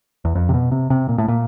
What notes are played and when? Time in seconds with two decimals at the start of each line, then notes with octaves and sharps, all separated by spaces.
0.25 E2
0.35 F2
0.49 C3
0.54 B2
0.72 C3
0.90 C3
1.09 A#2
1.18 A2
1.28 A#2